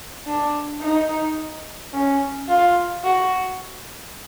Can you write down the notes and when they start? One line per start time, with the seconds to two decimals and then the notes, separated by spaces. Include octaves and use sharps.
0.27 D4
0.82 D#4
1.93 C#4
2.48 F4
3.04 F#4